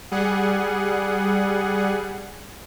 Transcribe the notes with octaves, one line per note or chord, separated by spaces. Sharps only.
G3 G#4 F#5